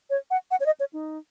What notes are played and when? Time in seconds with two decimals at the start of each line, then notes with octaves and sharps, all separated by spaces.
0.10 C#5
0.31 F#5
0.51 F#5
0.60 C#5
0.66 D#5
0.80 C#5
0.93 D#4